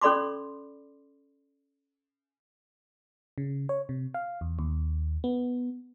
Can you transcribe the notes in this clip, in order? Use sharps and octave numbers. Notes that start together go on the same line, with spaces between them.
C#4 A4 D5 B5 C6 D6
C#3
C#5
C3
F5
E2
D#2
B3